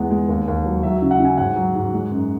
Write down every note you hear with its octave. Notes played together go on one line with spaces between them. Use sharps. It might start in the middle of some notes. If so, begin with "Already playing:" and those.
Already playing: E2 G#3 F#5
G#3
D#2
D#2
F#3
F#3 E5
E5
C#3
F#5
C#3
G#5
G#2 F#5
F#3
G#2
G#3
F#2